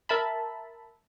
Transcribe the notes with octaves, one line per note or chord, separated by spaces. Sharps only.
A#4 E5 A5 B5